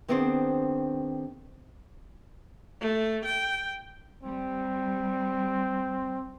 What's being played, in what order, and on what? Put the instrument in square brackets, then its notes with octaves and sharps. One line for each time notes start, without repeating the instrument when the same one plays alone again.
[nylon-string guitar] D#3 B3 C4 D4 G#4 C5
[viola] A3
G5
[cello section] G3 [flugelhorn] C4